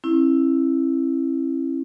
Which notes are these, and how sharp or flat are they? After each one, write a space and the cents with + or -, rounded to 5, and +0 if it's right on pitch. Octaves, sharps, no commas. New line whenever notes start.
C#4 -45 E4 +0